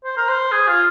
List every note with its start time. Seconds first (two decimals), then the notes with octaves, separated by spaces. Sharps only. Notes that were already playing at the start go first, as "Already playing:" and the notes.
0.04 C5
0.17 A#4
0.28 C5
0.52 G#4
0.68 F4